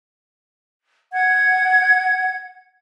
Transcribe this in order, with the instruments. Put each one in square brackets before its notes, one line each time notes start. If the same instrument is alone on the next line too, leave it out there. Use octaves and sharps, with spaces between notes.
[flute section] F#5 G#6